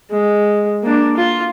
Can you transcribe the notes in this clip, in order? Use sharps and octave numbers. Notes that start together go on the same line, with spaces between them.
G#3
A#3 D4
F4